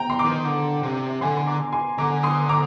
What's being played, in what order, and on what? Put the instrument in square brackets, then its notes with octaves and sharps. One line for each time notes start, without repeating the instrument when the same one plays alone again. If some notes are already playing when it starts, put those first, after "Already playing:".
Already playing: [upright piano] G5 A#5
C6
A#5 D6
[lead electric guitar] D#3
D3
C3
[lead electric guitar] D3 [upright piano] G#5 C6
[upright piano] C6
A#5 D6
G#5 C6
[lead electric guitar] D3 [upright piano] A#5 D6
[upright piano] C6 D#6
A#5 D6